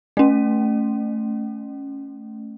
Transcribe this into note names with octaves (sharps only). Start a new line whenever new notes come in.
A3 C#4